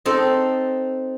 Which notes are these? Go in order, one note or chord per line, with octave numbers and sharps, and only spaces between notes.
C4 D#4 A4